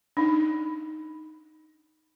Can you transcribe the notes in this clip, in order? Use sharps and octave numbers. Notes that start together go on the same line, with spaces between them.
D4 D#4